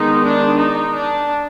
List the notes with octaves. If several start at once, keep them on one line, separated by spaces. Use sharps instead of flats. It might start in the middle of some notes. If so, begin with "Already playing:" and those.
Already playing: D#3 G#3 B3 D#4
D4
D#4
D4